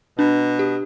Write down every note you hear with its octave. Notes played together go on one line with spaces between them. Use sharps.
B2 D4
G4